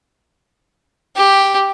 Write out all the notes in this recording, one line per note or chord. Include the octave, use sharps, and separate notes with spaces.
G4